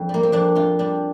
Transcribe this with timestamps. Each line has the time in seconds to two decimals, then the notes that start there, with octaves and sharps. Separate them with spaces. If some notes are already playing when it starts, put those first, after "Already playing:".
Already playing: F2 D4
0.09 G3 A#3
0.23 C4
0.32 F2 D4
0.55 F2 F4
0.79 G3 D4